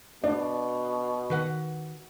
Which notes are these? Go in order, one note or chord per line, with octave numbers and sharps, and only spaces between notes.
B2 D4 D5
D#3 F#4 B4 F#5